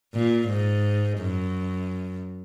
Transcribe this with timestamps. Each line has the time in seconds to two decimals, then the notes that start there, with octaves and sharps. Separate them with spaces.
0.14 A#2
0.48 G#2
1.20 F#2